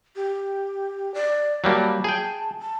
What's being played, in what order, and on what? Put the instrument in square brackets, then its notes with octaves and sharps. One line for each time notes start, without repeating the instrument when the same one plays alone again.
[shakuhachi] G4
D5
[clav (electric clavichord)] F#3 G3 A#3 [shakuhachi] A5
[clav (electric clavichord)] G#4 G5
[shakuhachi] A5